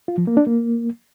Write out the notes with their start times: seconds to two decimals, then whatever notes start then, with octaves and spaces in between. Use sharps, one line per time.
0.08 F4
0.18 F3
0.27 A#3
0.37 D4
0.46 A#3